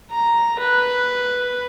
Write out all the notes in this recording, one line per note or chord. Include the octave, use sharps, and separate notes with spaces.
A#5
B4